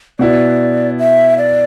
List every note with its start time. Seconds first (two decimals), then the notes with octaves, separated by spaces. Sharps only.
0.19 B2 B3 E4 D5
0.99 E5
1.38 D5